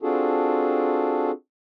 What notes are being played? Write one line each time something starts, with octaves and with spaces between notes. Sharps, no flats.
C4 D4 F4 F#4 G#4 A4